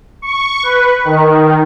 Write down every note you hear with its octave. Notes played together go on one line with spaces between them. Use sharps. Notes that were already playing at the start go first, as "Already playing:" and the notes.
C#6
B4
D#3